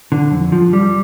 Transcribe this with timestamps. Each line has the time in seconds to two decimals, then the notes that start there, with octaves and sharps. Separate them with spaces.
0.12 D3
0.31 F2
0.52 F3
0.73 G3